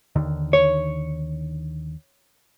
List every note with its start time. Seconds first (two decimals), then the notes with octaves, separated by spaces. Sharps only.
0.15 D#2 D3 D#3
0.53 C#5